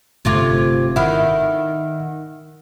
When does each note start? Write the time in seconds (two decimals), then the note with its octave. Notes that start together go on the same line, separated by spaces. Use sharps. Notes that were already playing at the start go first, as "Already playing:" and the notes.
0.25 G1 C3 A3 F4 D6 G#6
0.96 D#3 E4 E5 F#5 F6